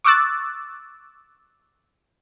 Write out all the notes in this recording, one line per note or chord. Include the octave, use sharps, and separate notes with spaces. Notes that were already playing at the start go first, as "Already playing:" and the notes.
C#6 D6 E6 F#6 A6